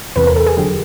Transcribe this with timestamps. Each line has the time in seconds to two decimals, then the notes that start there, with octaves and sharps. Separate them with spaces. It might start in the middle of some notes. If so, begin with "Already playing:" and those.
0.16 E2 C3 E3 B4
0.27 A#4
0.36 A4
0.46 G#4
0.57 F2 D3 F#3 G4